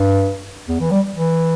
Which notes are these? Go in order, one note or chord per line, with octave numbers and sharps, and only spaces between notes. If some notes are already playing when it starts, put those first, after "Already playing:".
Already playing: G2
E2
E3
G3
E3